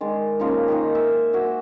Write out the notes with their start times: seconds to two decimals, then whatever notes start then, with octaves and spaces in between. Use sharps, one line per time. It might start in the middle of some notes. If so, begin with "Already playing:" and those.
0.01 D#3 G#3 D5
0.40 C#3 F3 A#3 D#4
0.68 D#3 D#4 C5
0.95 E5 G#5
1.33 A#3 F#4 E5